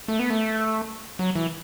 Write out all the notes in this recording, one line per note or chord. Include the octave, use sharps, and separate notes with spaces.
A3
B3
A3
F#3
E3